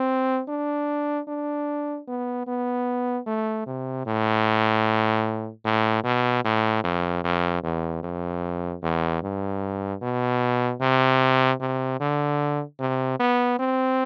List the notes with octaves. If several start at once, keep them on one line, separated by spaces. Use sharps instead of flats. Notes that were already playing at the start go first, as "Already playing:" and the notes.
Already playing: C4
D4
D4
B3
B3
A3
C3
A2
A2
B2
A2
F2
F2
E2
F2
E2
G2
B2
C3
C3
D3
C3
B3
C4